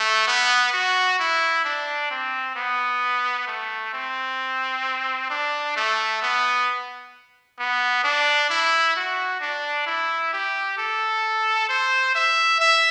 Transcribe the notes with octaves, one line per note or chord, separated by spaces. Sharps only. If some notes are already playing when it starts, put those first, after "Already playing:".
Already playing: A3
B3
F#4
E4
D4
C4
B3
A3
C4
D4
A3
B3
B3
D4
E4
F#4
D4
E4
G4
A4
C5
E5
E5